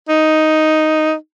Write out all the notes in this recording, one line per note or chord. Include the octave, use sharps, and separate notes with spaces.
D#4